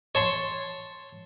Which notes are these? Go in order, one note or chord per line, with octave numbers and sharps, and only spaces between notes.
C#5 A5 C6